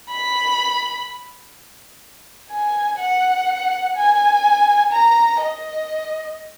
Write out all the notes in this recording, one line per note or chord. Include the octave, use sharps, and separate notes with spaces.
B5
G#5
F#5
G#5
A#5
D#5